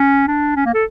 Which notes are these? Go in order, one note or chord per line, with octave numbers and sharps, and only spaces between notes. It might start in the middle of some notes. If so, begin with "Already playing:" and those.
Already playing: C#4
D4
C#4
A#3
A4